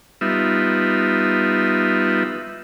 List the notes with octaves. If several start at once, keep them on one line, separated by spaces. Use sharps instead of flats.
G3 B3 D#4 F4 E5